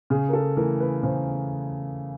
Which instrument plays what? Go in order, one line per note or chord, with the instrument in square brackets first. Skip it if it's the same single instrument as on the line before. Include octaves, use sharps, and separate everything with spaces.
[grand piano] C#3 [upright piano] G#4
[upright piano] A#4
A4
[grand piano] E3 A3 [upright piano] A#4
[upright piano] B4
[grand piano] C#3 [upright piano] C5